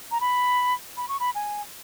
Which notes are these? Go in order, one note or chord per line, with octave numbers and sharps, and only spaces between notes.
A#5
B5
B5
C#6
B5
G#5